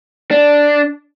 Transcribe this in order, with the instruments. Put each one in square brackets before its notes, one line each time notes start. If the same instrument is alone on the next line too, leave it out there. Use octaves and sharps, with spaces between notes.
[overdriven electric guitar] D4